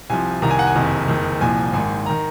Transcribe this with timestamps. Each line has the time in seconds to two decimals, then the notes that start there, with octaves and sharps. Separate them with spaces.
0.10 C2 C3 F3 G#5
0.42 C2 C3 D#3 A#5
0.51 G#5
0.59 F#5
0.67 G#5
0.75 F#1 F2 C3 D#3
1.08 F#1 F2 D#3
1.40 C2 A#2 F3 G#5
1.73 G#1 G#2 D#3 G#5
2.06 D#3 A#5